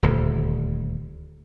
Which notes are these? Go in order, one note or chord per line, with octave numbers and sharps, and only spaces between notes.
D#1 D2